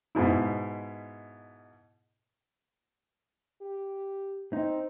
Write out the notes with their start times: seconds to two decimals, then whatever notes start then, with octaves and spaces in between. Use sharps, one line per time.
0.15 G#2 B2 E4
3.62 G4
4.53 C4 D#4